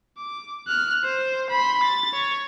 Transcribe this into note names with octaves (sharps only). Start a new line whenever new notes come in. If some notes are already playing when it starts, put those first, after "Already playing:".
D6
F6 F#6
C5
B5 C6
A6
C#5